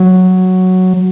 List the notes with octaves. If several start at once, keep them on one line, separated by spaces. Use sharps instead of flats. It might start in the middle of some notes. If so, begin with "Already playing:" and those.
Already playing: F#3